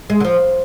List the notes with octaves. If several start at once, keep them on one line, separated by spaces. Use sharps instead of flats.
G#3
D3
F3